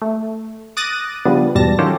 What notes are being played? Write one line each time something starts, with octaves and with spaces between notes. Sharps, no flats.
A3
D6 D#6 F#6 A6 A#6 D#7
C#3 F3 G3 B3 D4
E2 G#2 B2 G3 A5 A#6
D#3 F#3 C#4 F4 G4 A4